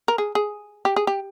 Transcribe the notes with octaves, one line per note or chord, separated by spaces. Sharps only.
A#4
G#4
G#4
G4
G#4
G4